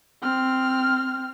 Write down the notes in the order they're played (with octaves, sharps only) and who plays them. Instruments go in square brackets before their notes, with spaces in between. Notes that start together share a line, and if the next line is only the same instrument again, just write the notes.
[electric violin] C4 F6